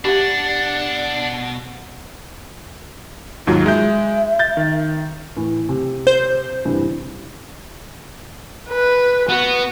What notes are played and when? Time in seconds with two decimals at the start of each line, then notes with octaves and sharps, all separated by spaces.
0.05 B2 D4 G4 D5 E5 F#5
3.47 D#2 G#2 F#3 F4
3.66 G#3 E5 G6
4.39 G6 A6
4.57 D#3
5.37 A2 E3
5.69 C3
6.07 C5 G6
6.65 G2 C3 E3
8.69 B4
9.29 B3 F#4